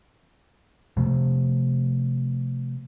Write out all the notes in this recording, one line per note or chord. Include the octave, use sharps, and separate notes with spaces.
C3 F3 A3 B3